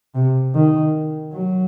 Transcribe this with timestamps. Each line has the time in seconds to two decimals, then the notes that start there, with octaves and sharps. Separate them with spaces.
0.15 C3
0.54 D#3
1.33 F#3